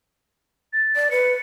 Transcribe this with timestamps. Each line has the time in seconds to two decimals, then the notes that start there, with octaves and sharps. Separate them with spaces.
0.73 A6
0.96 D5
1.11 B4 C#7